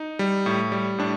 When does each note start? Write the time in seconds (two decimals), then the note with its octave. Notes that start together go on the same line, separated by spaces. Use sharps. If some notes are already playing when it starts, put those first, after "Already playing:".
Already playing: D#4
0.19 G3
0.46 A2
0.72 G3
0.98 A2 D4